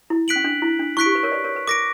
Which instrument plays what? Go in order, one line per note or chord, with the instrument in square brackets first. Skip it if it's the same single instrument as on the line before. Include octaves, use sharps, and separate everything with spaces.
[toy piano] E4
[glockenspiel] F#6 B6 D7 F#7
[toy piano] C#4
D4
E4
D4
[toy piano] E4 [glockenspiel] C#6 F#6 B6 D7
[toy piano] G4
B4
A#4 C#5
B4 D5
A#4 C#5
B4
[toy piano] A#4 [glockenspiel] D6 A#6 D7